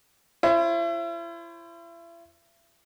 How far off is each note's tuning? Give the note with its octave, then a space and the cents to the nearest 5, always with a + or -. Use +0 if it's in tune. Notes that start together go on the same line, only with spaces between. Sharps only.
E4 +40 C5 +45